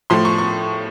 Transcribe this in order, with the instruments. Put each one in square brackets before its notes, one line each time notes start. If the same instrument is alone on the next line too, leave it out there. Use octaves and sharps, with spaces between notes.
[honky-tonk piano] A2 F3 A3 C6
C#6
C#6